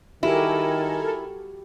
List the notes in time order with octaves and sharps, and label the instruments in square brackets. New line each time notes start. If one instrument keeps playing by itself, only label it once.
[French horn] D#3 [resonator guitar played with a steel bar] E4 [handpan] F#4 G4 [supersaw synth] A4 A#4 G#5